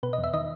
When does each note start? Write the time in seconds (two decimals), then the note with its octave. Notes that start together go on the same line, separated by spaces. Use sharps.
0.03 B2 B4
0.13 D#5
0.18 E2
0.24 E5
0.34 D#3 D#5